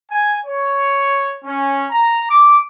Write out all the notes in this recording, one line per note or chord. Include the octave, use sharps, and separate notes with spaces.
G#5
C#5
C#4
A#5
D6